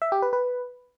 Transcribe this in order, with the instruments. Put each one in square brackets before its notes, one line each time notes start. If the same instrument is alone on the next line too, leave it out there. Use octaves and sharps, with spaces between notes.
[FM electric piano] E5
G4
B4
B4